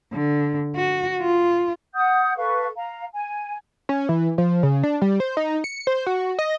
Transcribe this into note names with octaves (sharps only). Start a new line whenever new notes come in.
D3
F#4
F4
F#5 D#6 G6
A4 B4 F5 C#6
F5 A#5
G#5
C#4
E3
F3
C#3
D4
G3
C5
D#4
C#7
C5
F#4
D#5